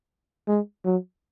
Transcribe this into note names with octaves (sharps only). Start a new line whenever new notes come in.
G#3
F#3